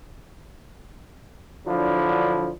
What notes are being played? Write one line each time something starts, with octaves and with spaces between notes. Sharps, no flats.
D3 F3 F#3 D4 E4